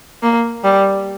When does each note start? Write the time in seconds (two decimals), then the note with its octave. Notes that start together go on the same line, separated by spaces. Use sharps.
0.23 A#3
0.64 G3